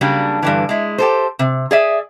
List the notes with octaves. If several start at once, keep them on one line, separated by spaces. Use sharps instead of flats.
C#3 F#3 G3 A#3 D4
G2 D3 E3
G#3 E4
G4 A4 C5
C3
G#4 D5 E5